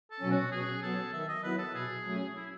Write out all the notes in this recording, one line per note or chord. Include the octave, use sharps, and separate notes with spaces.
A4
B2 F#3 C#4
F#4
B2 G#4
F#3 B3 A4
D#3 E5
D#5
F#3 B3 E4 B4
A4
B2 G#4
F#3 A3 C#4
E4